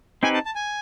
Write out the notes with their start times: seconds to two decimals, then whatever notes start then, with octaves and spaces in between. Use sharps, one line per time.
0.23 C4 D#4 G4 B4 G#5
0.34 A5
0.45 A5
0.55 G#5